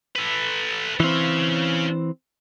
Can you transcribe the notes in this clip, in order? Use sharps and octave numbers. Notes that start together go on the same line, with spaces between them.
A4 B4
E3 C4 C#4 F5